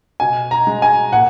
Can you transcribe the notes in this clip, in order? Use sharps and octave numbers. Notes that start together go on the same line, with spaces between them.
B2 G#5
A#5
G#3
G#5
A#2 F#5